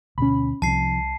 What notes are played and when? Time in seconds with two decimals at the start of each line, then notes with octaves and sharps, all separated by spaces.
0.18 D2 B2 A3 C#4 B5
0.62 C2 C3 F3 A5 C7